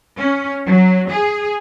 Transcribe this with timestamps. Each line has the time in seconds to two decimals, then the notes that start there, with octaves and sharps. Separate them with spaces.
0.18 C#4
0.67 F#3
1.11 G#4